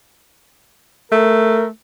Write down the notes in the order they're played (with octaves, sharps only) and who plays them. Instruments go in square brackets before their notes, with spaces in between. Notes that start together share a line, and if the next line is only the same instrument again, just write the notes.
[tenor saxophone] A3 [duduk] A#4